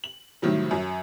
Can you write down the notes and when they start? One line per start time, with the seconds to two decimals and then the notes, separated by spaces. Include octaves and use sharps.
0.04 F#7
0.42 A2 C3 D#3 F#3 G3
0.71 F#2 F#3